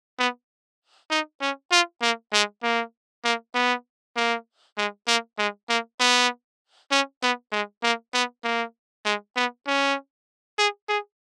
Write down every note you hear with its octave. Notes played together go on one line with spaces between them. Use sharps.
B3
D#4
C#4
F4
A#3
G#3
A#3
A#3
B3
A#3
G#3
A#3
G#3
A#3
B3
C#4
B3
G#3
A#3
B3
A#3
G#3
B3
C#4
G#4
G#4